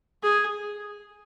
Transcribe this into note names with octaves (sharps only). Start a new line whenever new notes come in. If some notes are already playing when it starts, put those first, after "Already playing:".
G#4